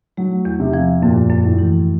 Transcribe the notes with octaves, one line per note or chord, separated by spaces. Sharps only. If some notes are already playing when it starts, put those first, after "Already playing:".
F#3 A3
E2
C3
F3
F#2 A#2
F#2
A2
E3